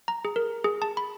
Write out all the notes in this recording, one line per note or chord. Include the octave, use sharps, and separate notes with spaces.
A#5
G#4
A#4
G#4
A5
B5